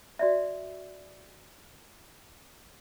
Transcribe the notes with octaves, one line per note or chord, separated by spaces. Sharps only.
F#4 D5 E5